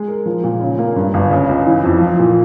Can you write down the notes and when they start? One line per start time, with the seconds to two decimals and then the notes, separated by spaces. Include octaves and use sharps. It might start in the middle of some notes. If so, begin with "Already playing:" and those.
Already playing: G#3
0.08 A#4
0.26 F3
0.44 A#2
0.61 C#3
0.79 A#3
0.96 G2
1.14 G1
1.31 C#3
1.49 C#2
1.66 E3
1.84 F2
2.01 F3
2.19 A#2